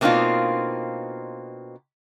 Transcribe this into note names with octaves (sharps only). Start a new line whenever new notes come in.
B2 A#3 C4 D4 D#4 F4